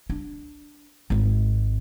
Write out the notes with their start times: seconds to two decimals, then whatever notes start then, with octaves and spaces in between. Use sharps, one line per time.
0.10 D4
1.10 G#1 G#3